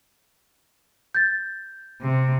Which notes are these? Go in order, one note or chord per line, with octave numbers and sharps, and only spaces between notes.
G6 A6
C3